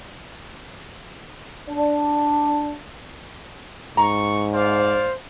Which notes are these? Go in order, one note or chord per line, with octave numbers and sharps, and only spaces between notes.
D4
G#2 A#5 C#6
C5 D5 F5